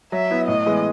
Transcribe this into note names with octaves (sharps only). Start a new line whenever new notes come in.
F#3 E5
B3 E4
A2 D#5
E3 G#3 B3